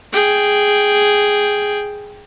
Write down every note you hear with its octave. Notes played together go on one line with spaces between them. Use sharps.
G#4 G5